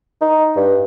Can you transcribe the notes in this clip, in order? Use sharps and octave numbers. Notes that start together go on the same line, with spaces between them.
D#4
G2